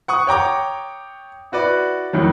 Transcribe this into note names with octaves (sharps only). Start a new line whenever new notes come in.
F#5 C#6 D#6
C#5 G5 A#5 D6
E4 F#4 B4 D5
F2 A2 D#3 F#3